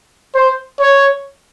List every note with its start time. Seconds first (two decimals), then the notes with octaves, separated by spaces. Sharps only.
0.35 C5
0.80 C#5